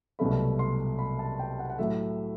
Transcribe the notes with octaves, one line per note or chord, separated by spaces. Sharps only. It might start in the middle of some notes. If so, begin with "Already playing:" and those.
C2 B2 F#3 A3 B5
C6
B5
A5
G5
F#5
F#5
A2 F#3 A3 E5